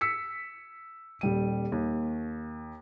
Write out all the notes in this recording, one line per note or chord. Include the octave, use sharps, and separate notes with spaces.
E6 B6 C#7
D#1 G3 D#7
D#2